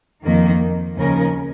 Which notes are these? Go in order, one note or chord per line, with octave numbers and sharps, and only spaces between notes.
F2 D#3 A#3
D#2 C#3 F3 C#4 A#4